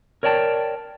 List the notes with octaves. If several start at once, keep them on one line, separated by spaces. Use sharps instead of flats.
A#4 C#5 D5 G5 A5